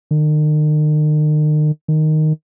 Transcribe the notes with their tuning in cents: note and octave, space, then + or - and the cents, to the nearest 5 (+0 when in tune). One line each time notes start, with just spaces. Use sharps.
D#3 -40
D#3 -5